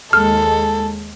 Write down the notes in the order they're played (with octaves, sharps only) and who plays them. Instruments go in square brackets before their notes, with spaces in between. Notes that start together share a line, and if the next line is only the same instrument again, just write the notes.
[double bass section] D#2 G#3 [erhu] A4 [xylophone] F6